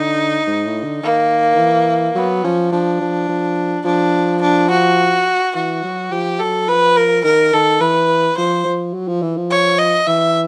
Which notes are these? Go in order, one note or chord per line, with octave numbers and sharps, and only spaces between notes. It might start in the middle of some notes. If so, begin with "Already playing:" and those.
Already playing: D3 D#4
G#2
A2
D3
D#3 A#3
D#3
E3
F#3 B3
F3 C#4
F3 D4
F3
F3
F3 D4
D4
F#4
E3 F#4
F#3
F3 G4
F#3 A4
F3 B4
A#4
D#3 A#4
D#3 A4
E3 B4
F3 C5
F3
F#3
F3
E3
F3
C#5
D#5
E3 E5